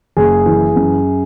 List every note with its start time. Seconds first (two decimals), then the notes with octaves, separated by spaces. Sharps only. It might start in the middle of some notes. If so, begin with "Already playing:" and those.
0.17 F#1 G#4
0.46 E3
0.76 F#2